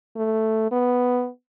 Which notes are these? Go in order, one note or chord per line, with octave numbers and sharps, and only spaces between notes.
A3
B3